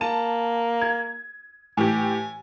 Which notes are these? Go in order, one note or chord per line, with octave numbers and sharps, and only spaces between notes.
A#3 A5
G#6
A2 E3 G4 G#5